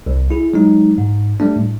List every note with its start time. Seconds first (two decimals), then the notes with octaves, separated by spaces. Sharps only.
0.06 C2
0.31 E4 G#4
0.53 F#3 G#3 D#4
0.98 G#2
1.40 G3 A3 D4
1.56 A2